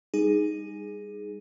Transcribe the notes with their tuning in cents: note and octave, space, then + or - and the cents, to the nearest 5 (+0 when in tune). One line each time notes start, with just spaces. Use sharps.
G3 +35 D#4 +0 G#4 +0